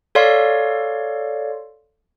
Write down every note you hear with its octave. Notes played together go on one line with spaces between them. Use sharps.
A4 C#5 D5 F5 C6